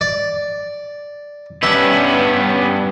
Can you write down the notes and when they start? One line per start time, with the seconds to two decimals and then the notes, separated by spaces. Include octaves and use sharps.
0.01 D5
1.63 G2 B3 C#4 B4 E5